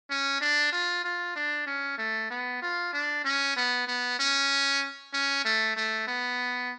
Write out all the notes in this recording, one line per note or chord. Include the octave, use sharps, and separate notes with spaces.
C#4
D4
F4
F4
D4
C#4
A3
B3
F4
D4
C#4
B3
B3
C#4
C#4
A3
A3
B3